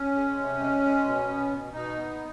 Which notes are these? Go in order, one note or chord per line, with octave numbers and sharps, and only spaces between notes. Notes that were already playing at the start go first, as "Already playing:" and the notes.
Already playing: C#4
G#3
C3
G#3
G#3
B2
B3
B2
B2 D#4
B3